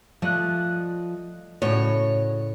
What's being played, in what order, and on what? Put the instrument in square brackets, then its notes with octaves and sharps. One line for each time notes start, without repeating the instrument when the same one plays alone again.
[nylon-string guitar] F3 D5 [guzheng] A3 [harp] D#5 F#6
[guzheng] A2 C#3 [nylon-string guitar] F#4 [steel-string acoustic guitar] C#5